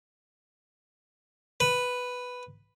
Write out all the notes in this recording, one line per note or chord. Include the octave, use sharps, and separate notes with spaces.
B4